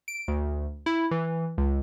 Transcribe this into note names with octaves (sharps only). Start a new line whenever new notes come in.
D7
D2
E4
E3
C#2